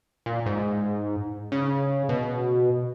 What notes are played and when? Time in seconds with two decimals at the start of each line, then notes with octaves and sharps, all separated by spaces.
0.26 A#2
0.46 G#2
1.52 C#3
2.09 B2